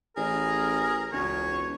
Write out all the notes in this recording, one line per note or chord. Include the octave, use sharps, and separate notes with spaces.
A1 G#4 A#4
E1 C#2 C#5